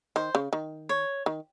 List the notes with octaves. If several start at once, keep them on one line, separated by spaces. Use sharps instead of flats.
D#3 C5
C#3
D#3
C#5
D#3